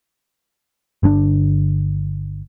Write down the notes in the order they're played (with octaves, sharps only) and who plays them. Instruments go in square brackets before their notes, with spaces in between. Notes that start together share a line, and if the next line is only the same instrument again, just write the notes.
[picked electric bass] G1 D3 C#4 D4